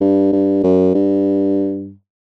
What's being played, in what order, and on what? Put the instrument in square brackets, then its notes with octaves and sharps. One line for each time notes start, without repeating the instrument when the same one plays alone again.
[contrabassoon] G2
G2
F#2
G2